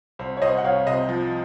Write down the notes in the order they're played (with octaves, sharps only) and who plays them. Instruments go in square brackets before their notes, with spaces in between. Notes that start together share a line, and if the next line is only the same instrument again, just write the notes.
[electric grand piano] C2 [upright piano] C5
[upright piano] C#5
[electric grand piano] C2 [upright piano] C5 D#5
[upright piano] F#5
[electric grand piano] C2 [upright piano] C#5 F5
[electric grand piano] C3 [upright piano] C5 D#5
[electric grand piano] F3